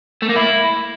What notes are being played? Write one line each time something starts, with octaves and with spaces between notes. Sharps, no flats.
A3
A#3
E4